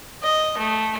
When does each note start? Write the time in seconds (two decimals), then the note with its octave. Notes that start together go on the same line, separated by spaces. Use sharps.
0.23 D#5
0.58 A3